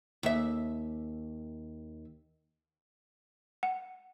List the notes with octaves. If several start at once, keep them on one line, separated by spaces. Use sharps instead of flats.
D#2 E5
F#5